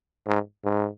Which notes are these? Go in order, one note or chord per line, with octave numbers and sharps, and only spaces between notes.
G#2
G#2